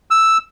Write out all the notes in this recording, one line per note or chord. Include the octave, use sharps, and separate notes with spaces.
E6